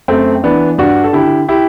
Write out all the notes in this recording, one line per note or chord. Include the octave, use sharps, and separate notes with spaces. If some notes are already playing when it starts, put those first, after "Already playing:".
F#2 A3 C4
E3 B3 D4
G2 D4 F#4
A4
D3 E4 G4
E4 G4